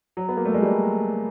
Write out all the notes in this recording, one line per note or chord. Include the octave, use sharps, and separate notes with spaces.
F#3
B3
A#3
A3
G#3
G3